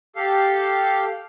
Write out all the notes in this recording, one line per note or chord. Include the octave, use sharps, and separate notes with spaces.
G4 A4 F5